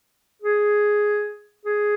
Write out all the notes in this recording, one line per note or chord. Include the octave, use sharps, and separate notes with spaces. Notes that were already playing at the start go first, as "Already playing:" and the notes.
G#4
G#4